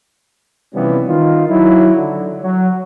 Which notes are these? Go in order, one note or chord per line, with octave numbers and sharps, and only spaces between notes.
C3 E3 F3 G3 B3 C#4
D#3 D#4 F4
F#3 D#4 E4
D3
F#3